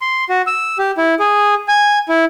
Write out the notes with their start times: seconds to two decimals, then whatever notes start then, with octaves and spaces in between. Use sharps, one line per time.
0.01 C6
0.29 F#4
0.47 E6
0.78 G4
0.98 E4
1.19 G#4
1.68 G#5
2.09 E4